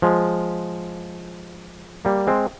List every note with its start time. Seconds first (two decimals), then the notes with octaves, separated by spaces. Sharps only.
0.02 F3 G#3
2.05 G3 A#3
2.27 G#3 C4